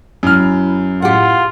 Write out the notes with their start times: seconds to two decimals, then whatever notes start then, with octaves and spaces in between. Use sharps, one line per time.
0.23 F#2 E4 F6
1.02 A2 F4 G4 F#5